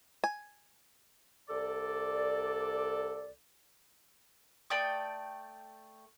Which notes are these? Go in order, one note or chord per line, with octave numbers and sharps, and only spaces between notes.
G#5
C2 A4 D5
A3 D5 G5 D#6